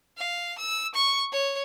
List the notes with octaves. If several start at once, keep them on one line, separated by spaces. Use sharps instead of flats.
F5
E6
C#6
C#5